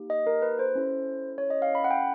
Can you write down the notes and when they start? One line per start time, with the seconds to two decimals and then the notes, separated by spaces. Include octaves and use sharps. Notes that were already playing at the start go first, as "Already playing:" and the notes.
Already playing: A#3 D#4 G4
0.10 D#5
0.27 A#4
0.42 B4
0.59 C5
0.75 C#4 E4 A4
1.38 C#5
1.50 D#5
1.62 F5
1.75 B5
1.84 F#5
1.91 G5